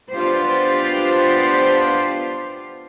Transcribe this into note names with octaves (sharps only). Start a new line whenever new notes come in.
B3 D4 F4 G4 C5